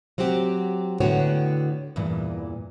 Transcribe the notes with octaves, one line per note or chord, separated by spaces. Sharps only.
F#3 C4 F#4 G4
A2 D3 B3 F#4 C#5 G5
E2 G2 A#2 E3